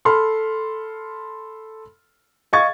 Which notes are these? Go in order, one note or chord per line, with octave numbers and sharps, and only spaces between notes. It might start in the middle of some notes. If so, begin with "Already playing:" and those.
A4 B5 C6 F6
D#5 F5 C#6 G#6 A6